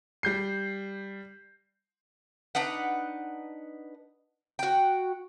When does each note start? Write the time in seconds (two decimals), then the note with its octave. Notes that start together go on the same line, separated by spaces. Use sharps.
0.23 G3 G6 C7
2.55 D4 D#4 B4 F#5
4.59 F#4 G5